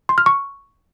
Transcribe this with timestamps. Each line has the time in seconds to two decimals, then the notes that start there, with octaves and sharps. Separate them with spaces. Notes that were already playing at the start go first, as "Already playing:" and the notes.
0.09 C6
0.18 F6
0.26 C#6